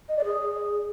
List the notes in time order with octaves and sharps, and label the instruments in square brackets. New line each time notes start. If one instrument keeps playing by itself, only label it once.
[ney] D#5
D5
G#4